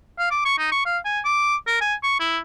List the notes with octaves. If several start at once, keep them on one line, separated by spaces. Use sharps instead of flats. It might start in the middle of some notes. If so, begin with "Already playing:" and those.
F5
D6
C#6
D#4
C#6
F5
G#5
D6
A#4
G#5
C#6
E4